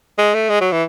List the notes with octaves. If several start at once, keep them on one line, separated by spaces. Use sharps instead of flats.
G#3
A3
G#3
F#3
E3